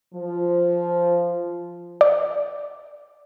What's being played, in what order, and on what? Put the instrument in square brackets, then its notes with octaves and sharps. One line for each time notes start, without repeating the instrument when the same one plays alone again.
[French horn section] F3
[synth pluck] D5